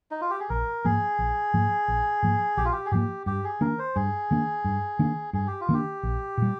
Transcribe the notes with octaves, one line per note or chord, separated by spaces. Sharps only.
D#4
F4
G4
G#4
A#1 A#4
G#2 F3 A#3 G#4
A#1
G#2 F3 A#3
A#1
G#2 F3 A#3
A#1 G4
F4
G4
G#4
G#2 F3 A#3 G4
G2 G4
G#4
D#3 A#3 D4 A#4
C5
G2 G#4
D#3 A#3 D4
G2
D#3 A#3 D4
G2 G#4
G4
F4
D#3 A#3 D4 G4
A#1
A#2 G3